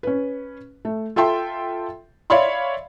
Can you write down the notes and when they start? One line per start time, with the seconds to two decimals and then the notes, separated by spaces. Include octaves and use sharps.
0.03 C#4 B4
0.85 A3
1.16 F4 A4 E5 G5 C6
2.30 C#5 D5 E5 F5 B5 C6